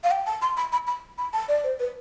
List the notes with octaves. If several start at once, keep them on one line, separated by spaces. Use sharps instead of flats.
F5
G5
A5
C6
B5
B5
B5
B5
A5
D5
C5
B4